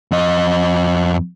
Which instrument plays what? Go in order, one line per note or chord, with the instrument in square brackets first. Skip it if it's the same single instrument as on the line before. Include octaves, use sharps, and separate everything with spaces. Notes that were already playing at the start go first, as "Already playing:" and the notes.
[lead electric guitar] F2 D#5